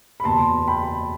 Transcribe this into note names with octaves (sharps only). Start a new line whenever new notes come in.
B5
F#1 E2 B2 A5 C6
G5 B5